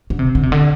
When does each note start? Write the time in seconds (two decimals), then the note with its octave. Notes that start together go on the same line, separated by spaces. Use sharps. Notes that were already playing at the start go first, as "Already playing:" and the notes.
0.10 D3
0.19 C3
0.35 D3
0.43 C3
0.52 D3